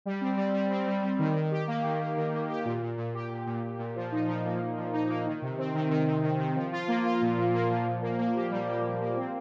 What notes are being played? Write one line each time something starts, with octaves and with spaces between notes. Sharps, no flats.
G3
C4
G3
G3
C4
G3
G3
D#3
D#3
G4
A#3
D#3
A#3
D#3
A#3
G4
A#2
A#2
A#2
G4
A#2
A#2
A#2
A#2
F3
D#4
F3
A#3
F3
F3
D#4
A#3
D#3
C3
C4
D#3
D#3
D#3
D#3
D#3
F3
F4
A#3
F4
A#2
A#2
A#3
F3
A#2
A#3
A#3
G4
G3
G4
G3
A#3
C4